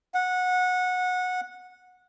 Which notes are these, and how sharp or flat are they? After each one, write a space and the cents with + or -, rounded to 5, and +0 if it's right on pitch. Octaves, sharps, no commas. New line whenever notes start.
F#5 -20